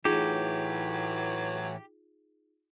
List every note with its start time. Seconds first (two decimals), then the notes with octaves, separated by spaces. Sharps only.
0.05 A2 E3 F#3 D#4 F4 G4 G#4